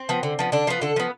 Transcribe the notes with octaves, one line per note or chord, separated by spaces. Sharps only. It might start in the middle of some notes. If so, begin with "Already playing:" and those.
Already playing: C4
F3 B3
D3
F3 B3
D3 D4
F3 B3 F4
D3 A4
F3 B3